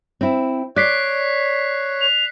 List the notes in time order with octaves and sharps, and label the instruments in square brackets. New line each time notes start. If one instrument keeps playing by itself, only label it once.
[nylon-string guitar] C4 E4
[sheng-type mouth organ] C#5 [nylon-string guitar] D5 [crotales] F#6 B6 C7
[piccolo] F7